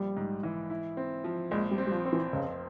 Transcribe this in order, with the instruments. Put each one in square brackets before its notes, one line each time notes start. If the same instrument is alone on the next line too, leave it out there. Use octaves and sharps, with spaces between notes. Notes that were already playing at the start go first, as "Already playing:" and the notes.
Already playing: [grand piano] A#1 [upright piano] G3
[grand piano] G#2
E3
E4
C4
F3
[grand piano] A#1 [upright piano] G#3
[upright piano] G3
[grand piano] C4
[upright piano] G3
F3
[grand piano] C4
[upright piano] E3
[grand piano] F1 [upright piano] C#3